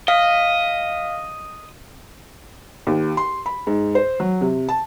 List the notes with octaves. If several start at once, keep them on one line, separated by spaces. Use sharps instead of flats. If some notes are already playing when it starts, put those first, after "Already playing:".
D#5 F5
D#2
C6
B5
G#2
C5
F#3
C3
A5